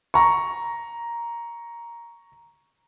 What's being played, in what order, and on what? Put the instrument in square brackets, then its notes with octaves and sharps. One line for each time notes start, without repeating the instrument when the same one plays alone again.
[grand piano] A#5 C#6